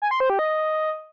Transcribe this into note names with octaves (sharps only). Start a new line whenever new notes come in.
G#5
C6
C5
G4
D#5